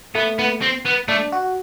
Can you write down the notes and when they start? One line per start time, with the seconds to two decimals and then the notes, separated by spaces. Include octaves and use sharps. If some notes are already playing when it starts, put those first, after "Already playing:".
0.15 A3 B3
0.39 B3
0.61 C4
0.85 B3
1.08 A3 D4
1.32 F#4